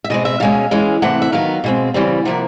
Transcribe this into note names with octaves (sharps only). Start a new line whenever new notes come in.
E5
B2 G#3 C4 D#5
E5
B2 G#3 C#4 F5
E3 G#3 C#4
C3 E3 A3 C4 F#5
E5
D#3 F#3 B3 F5
B2 G#3 C4
C#3 E3 G3 C4
C3 F3 A#3 F#5